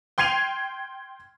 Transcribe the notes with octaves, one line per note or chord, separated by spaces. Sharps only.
G5 C6 G#6 C7 D#7 F7